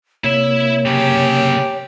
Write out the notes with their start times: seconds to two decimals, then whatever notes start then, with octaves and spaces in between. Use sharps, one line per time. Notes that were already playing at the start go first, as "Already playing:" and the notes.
0.24 C3 A#3 E4 C#5 E5
0.86 C#3 F#3 G4